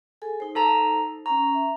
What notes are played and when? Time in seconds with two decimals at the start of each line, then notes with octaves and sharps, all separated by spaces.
0.22 G#4 A4 G#5
0.40 D#4 C5
0.55 A4 A5 A#5
1.26 C#4 A#5 C#6
1.54 E5